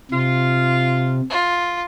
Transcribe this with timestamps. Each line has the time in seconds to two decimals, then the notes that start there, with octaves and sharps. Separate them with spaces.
0.11 C3 F4
1.30 F4